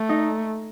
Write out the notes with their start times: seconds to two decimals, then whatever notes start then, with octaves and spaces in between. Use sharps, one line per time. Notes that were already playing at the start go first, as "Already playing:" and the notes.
Already playing: A3
0.09 D#4